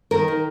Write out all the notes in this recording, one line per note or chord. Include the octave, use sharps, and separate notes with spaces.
D#3 A#4
D#3